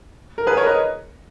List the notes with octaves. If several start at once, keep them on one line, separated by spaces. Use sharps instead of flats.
A#4
G#4 B4
A#4 C#5
B4 D#5